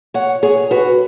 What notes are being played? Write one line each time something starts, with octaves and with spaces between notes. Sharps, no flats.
C#5 F#5
G#4 C#5
F#4 B4